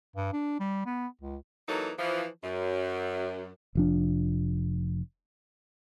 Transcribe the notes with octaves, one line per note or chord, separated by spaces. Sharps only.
G2
D4
G3
B3
C#2
E3 F#3 A#3 D#4 A4
E3 F3
F#2
F1 F3 D4